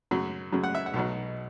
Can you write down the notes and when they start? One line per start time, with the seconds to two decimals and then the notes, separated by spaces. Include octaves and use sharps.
0.11 F#2 C#3 F#3
0.52 F#2 C#3 F#3
0.64 F#5
0.75 E5
0.86 F#5
0.94 B1 B2 F#3